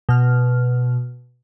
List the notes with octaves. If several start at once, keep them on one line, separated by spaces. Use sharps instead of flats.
B2 F6